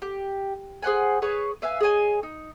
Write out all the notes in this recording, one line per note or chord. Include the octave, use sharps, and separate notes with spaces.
G4
G#4 C5 F#5 G#5
G#4 B4 C#5 C#6
B4 E5 F5 G#5
G#4 C#5 D#5 G#5
D#4